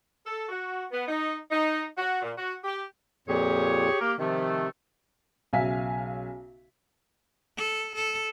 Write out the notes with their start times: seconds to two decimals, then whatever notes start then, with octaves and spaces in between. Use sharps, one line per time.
0.26 A4
0.48 F#4
0.91 B3
1.08 D#4
1.51 D#4
1.98 F#4
2.22 A#2
2.37 F#4
2.64 G4
3.28 F2 A#2 G4 G#4 C#5
4.00 A#3 G4 A#4
4.19 C3 D#3 F3 A3
5.53 B1 C#3 E5 F5 G#5 B6
7.57 A4
7.96 A4